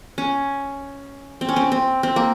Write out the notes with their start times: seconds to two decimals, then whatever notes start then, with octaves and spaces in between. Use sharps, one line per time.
0.18 C#4
1.41 C4
1.49 C#4
1.56 C4
1.72 C4
2.03 C4
2.16 A#3